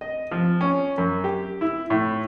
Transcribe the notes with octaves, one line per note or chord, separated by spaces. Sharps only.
D#5
F3
C#4
F#2
G4
E4
A2